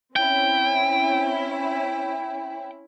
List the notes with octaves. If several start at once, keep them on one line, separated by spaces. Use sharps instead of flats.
C4 C#4 E4 G5